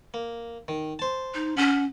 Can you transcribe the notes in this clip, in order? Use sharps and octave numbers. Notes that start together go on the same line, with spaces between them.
A#3
D#3
C5 A5
D#4
C#4 F#5